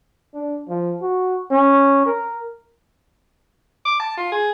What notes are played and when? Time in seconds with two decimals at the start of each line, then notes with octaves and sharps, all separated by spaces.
0.34 D4
0.68 F3
1.02 F#4
1.51 C#4
2.06 A#4
3.85 D6
3.99 A5
4.17 F4
4.32 G#4